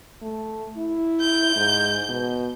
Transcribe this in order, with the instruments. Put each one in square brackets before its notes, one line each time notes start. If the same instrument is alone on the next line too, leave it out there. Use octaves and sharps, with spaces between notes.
[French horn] A3
E4
[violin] G6
[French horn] G#2
B2